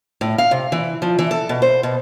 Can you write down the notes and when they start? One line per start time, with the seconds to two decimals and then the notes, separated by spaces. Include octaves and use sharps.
0.21 A2
0.38 F5
0.51 C3
0.72 E3
1.02 F3
1.19 E3
1.31 A4
1.49 B2
1.62 C5
1.83 B2